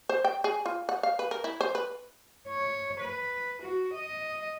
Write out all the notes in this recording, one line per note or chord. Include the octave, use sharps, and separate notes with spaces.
C5
G5
G#4
F4
F#5
F5
B4
A#4
E4
C5
B4
C#5
B4
F#4
D#5